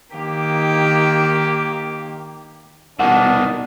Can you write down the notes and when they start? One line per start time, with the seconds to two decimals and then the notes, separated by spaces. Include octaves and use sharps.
0.15 D#3 A#3 G4
3.00 C2 B2 D#3 D4 F#5